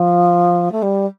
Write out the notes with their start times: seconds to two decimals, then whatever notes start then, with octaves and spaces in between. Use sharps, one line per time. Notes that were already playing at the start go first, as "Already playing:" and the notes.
Already playing: F3
0.71 A3
0.82 G3